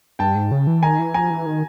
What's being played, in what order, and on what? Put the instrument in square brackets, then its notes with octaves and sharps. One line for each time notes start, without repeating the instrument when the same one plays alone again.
[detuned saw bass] G2 [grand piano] G5 A5
[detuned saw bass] G#2
C#3
E3
[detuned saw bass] D#3 [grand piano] G#5 A#5
[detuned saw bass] E3
[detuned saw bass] F3 [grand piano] G#5 A#5
[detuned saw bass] E3
D#3